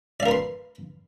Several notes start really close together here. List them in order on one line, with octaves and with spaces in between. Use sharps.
D5 F5 A#4 B4 C6